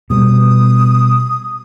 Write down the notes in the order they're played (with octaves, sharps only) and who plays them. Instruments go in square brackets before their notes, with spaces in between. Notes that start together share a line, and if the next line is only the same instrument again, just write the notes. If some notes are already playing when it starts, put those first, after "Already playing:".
[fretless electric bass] B2 G3 B3 [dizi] D#6